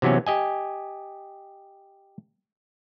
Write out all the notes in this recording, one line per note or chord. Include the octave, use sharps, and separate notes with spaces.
C3 E3 F#3 B3 C#4
G4 D#5 G#5